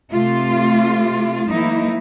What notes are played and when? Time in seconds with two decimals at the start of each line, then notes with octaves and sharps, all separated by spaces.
0.12 C3 A3 F4
1.49 E3 F#3 A3 A#3 D#4 E4